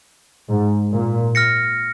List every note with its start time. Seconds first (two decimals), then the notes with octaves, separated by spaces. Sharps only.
0.49 G#2
0.92 A#2
1.35 F6 A#6 C#7